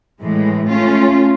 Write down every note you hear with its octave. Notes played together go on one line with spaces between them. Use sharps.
A2 E3 G#3
A3 C#4 F4